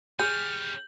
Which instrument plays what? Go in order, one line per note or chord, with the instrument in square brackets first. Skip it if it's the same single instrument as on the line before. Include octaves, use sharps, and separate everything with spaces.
[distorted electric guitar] G3 C#4 [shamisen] G#4 [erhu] F6 [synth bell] G6